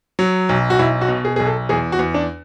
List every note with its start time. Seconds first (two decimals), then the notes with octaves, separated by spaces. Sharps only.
0.19 F#3
0.49 B1
0.70 F#4
0.79 B1 E4
1.01 F#4
1.08 B2
1.25 G#4
1.36 B1 G#4
1.46 A4
1.69 E2 G#4
1.92 F#4
1.99 E2
2.14 D4